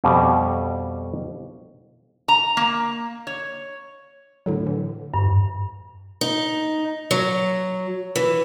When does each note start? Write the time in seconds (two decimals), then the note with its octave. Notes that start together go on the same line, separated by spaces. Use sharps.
0.04 F2 B2 G3
2.28 A#5
2.57 A#3
3.27 C#5
4.46 A2 D3 F#3
4.67 D3 E3
5.14 G2
6.21 D#4
7.11 F#3
8.16 E3